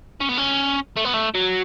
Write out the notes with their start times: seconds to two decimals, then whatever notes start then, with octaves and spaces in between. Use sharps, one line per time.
0.20 C#4
0.29 B3
0.37 C#4
0.96 A3
1.05 B3
1.14 A3
1.34 F#3